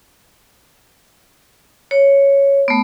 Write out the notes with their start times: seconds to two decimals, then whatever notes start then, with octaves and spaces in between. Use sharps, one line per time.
1.91 C#5
2.68 A3 B3